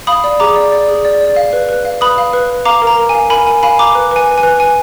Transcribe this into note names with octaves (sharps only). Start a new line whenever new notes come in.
F5 B5 D#6
D5
G#4 A#5 D6
D5
D5
G#4
D5
D5
F5
B4
B4
F5
B4 B5 D#6
F5
B4
B4
F5 A#5 D6
A#4
A#5
A#4
G#5
F5
A#4 G#5 B5
A#4 G#5
F5 G#5 B5
F5 A#5 D6
B4
B4 G#5
B4
G#5
B4
B4 G#5